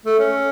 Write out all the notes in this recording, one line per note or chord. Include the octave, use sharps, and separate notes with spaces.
A3
C#4